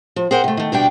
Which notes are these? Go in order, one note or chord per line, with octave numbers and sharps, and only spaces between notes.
F3
G#4 A#4 C5 F#5 G5
C3 A3
D#3 A3
D2 B2 G3 D4 G5